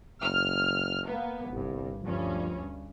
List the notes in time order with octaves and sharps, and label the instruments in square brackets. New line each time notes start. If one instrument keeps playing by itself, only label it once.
[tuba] F#1 [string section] F6
[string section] A#3 B3
[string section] G1 G2 [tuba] C2
[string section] D2 G2 C#4 [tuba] F3